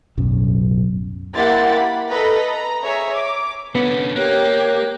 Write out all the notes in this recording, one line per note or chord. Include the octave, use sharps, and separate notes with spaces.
D1 B1 F#2
A#3 E4 G4 F#5 C6 A6
B5
A4 B4 D#5 A#5 B5
A#5
G#4 C#5 E5 A#5
D6
D3 B3 C#4
A#3 G4 C#5 F#6